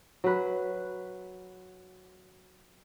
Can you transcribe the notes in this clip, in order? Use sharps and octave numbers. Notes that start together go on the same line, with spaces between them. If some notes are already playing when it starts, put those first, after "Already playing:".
F#3 B4